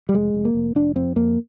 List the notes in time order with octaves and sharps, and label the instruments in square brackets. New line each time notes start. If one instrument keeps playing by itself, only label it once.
[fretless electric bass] G3
F1 G#3
F1
A#3
F1
F1 D4
F2 C4
F2 A#3